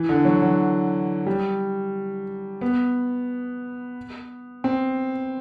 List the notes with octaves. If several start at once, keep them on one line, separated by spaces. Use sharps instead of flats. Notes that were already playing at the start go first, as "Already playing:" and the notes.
Already playing: E3
D3
F#3
F#3
G3
B3
C4